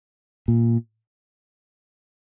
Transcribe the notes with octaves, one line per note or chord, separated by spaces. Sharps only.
A#2